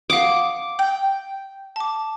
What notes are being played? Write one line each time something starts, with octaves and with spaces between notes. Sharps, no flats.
F5 F#5 D6 D#6
G5
A5 D6